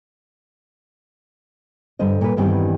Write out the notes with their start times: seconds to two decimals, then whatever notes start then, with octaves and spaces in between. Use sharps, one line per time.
1.99 G2 D3 C5 D#5
2.21 A#2 B4
2.37 E2 G2 D#3 E3 C4 G4